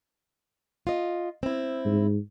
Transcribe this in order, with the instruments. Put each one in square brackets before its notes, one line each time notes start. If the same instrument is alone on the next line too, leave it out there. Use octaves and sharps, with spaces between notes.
[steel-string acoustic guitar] F4 D#5
C4 E4
[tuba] G#2